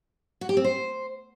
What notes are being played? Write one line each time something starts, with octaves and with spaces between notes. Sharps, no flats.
F#4
G4
C4
C5